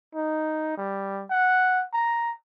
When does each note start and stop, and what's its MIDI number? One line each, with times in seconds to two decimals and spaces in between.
0.15 0.74 63
0.77 1.24 55
1.30 1.83 78
1.93 2.32 82